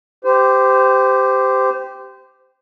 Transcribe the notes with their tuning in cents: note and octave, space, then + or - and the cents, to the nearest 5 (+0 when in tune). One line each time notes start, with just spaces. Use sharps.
G4 +0 C5 -25